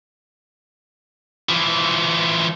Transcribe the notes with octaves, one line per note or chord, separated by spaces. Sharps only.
E3 F3